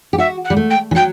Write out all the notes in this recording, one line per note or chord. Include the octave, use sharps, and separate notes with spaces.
G4
F#4 E5
F#5
G3
A3
G5
E3
F#3 G5